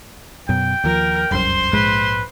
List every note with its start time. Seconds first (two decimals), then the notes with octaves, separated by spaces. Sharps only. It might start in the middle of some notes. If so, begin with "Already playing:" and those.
0.49 F#2 B2 G5
0.84 D#2 F3 A#4
1.31 F1 C2 F#2 C5 C6
1.73 A#1 G#2 G#3 B4